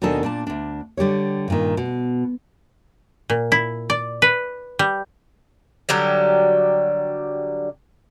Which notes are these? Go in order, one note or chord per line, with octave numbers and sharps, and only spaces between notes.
D#2 B2 D#3 D4 A4 G#5
A#2 D4 A5
D2 D4
D3 G3 G4 C#5
G2 A#2 D#3
B2
A#2
E4
D5
B4
G3
D3 F#3 G3 G4